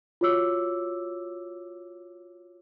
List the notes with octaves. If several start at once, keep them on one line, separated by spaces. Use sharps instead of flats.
F4 F#4 C#5 D6 E6